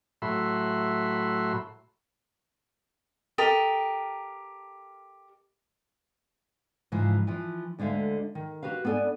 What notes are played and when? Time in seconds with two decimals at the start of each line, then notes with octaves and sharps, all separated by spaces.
0.22 A2 F#3 E5 B5 C6
3.38 G4 A4 A#4 D#5
6.92 G#2 C#3 E3 F3
7.27 E3 F3
7.78 D2 D3 G#3 E5 F5
8.35 D#3
8.63 F#4 G4 B4 F5
8.85 B3 D4 A4 D5 G#5